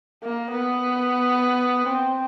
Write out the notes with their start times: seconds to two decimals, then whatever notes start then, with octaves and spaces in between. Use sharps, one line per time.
0.23 A#3
0.52 B3
1.93 C4